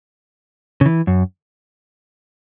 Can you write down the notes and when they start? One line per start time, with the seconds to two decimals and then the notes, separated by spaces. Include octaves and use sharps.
0.81 C#3
0.86 E3
1.07 F#2